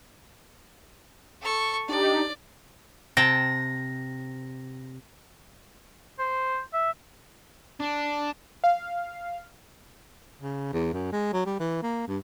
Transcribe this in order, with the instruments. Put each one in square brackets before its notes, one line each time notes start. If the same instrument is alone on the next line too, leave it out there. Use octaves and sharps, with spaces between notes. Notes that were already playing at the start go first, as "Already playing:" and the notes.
[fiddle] A4 C#6
[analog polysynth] D4 D#4 G4 [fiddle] D5
[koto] C3 G5 A5 [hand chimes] A#6
[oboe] C5
E5
[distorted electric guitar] D4
[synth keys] F5
[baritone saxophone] C#3
E2
F#2
G#3
F#3
G3
E3
A#3
G2